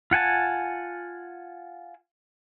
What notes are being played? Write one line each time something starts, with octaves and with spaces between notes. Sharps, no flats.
F4 F#5 G#5 A5